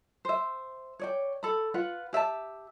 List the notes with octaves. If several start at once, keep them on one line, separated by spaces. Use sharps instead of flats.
C5 E5
C#5 D5 G5
A4 B5
F4 B4 F#5
G4 E5 F5 A5